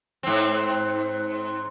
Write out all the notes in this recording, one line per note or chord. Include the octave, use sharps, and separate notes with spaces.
G#2 C4